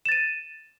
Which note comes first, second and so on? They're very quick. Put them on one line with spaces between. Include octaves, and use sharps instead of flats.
E7 A6 D#7